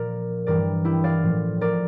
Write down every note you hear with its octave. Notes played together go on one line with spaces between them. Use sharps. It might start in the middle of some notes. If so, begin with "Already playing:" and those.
Already playing: A#2 F3 A#4 D5
G2 E3 G3 A#4 D5
E4 G4
D5 F5
A2 F3
A#4 D5